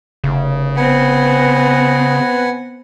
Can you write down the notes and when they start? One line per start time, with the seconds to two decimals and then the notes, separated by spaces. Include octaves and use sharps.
0.24 F1 C#3
0.76 B3 C4 B4 F#5 G#5